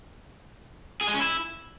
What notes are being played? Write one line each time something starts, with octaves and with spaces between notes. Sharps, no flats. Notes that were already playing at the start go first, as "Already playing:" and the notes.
G#4
G#3
C#4
E4